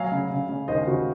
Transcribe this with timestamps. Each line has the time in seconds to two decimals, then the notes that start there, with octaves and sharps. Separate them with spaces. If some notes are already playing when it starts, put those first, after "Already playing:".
Already playing: F#3 F5 G#5
0.12 C#3
0.31 C#3
0.49 C#3
0.68 D#2 C5 D#5
0.87 C#3 F#4